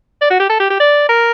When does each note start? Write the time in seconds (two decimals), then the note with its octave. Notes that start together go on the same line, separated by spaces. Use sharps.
0.21 D5
0.30 F#4
0.40 G4
0.50 A4
0.60 G4
0.70 G4
0.80 D5
1.09 A#4